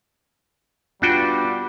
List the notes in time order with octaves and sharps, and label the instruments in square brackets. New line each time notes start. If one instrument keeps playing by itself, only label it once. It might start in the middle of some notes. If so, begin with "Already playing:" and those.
[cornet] G3 [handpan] B3 F4 [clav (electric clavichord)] D4 F#4 G5